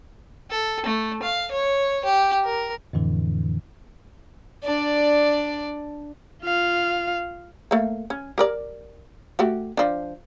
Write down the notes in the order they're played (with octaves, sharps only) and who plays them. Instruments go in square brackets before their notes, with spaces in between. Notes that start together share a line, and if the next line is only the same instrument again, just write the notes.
[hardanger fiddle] A4
A3
F5
C#5
G4
A#4
[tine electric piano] F2 A2 D3 E3
[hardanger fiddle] D4 D5
[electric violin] F4 F5
[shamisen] A3 A#3
C#4
G4 A#4 D5
A3 F#4 G4
F3 D4